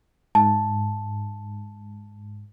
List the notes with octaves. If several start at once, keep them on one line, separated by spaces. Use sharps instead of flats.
G#2 A5